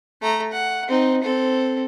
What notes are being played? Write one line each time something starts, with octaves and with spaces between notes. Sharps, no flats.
A3 A#5
F#5
C4 D#4
C4 A4